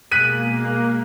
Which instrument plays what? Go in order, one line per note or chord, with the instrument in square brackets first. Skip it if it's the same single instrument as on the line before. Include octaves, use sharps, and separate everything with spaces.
[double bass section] B2 G#3 [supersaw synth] A#3 [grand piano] F#6 B6 D#7